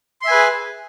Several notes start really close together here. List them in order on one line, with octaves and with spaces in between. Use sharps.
C6 E5 G#5 B4 G#4